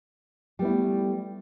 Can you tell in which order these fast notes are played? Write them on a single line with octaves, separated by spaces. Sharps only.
G3 B3 E4 A3